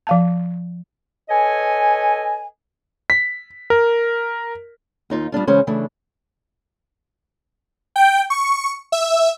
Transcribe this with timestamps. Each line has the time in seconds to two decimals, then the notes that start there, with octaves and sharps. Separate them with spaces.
0.07 F3 F5 A5
1.30 A4 B4 C#5 D#5 G#5
3.10 B6
3.70 A#4
5.10 D#2 D#4 F4
5.32 G3 B3 D4 F4
5.47 C#3 E3 G#3 C#4 C5
5.67 C#3 E3 A3 D4
7.96 G5
8.30 C#6
8.92 E5